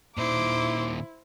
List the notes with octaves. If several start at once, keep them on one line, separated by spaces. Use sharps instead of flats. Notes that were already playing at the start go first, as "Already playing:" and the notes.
A#2 D#3 E4 C5 D6